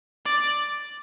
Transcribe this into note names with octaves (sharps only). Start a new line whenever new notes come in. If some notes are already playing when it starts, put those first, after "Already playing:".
D5